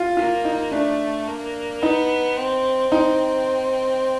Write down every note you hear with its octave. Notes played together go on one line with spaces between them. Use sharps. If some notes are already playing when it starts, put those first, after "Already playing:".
Already playing: F4
A#3 F4
D#4
A3 D4
A#3
B3 D#4
C4
C4 D#4